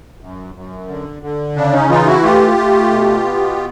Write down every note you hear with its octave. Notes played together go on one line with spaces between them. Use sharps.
F#2
F#2
D3
D3
C#3 D4
C#4 D#4
E3 D#4 F4
E4 F#4
A3 F4 G4
A3
B2
B3